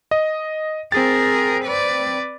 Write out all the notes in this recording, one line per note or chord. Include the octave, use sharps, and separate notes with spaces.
D#5
C4 G#4 A#4 A6
B4 D5